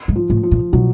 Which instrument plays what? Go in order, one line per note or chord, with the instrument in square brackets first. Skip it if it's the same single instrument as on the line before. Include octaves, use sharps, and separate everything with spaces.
[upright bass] G#2
[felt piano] F3
[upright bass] A2
[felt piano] F3
[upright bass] A#2
[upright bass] B2 [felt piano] F#3